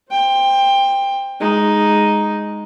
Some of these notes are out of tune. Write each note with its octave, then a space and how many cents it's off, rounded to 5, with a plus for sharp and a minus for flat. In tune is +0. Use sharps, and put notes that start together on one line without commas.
C5 +0 G5 +20
G#3 +0 D#4 +0